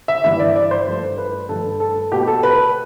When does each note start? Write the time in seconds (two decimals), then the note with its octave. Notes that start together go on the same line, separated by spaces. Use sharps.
0.08 E5
0.24 G2 E3 G3 E5
0.40 D5
0.56 D5
0.71 C5
0.87 G2 F3 A3
1.18 B4
1.49 G2 F3 A3 A4
1.80 A4
2.12 B2 A3 G4
2.27 A4
2.43 B4